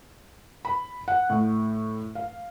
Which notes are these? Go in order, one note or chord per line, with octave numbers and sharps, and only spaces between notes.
B5
F#5
A2
F5